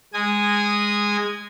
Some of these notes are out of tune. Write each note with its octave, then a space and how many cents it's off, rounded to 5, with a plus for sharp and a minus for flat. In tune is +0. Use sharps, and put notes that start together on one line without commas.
G#3 -10 G#5 -10 D#6 +0